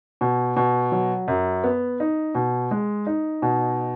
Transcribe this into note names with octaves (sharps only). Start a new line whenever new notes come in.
B2
B2
F#3
F#2
B3
D#4
B2
G#3
D#4
B2